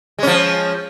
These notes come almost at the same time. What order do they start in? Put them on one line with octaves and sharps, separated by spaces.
G#3 C#4 F3